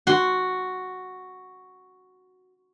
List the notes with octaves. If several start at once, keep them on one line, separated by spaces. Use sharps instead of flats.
F#4 C6